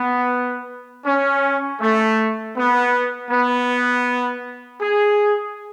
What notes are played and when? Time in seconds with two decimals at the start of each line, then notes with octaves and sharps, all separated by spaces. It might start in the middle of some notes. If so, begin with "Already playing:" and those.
Already playing: B3
1.06 C#4
1.81 A3
2.57 B3
3.31 B3
4.81 G#4